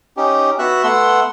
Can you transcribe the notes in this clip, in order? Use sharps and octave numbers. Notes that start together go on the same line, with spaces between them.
C#4 D#4 G4
B3 F#4 E5 F#6
A3 B3 F#5 C6 E6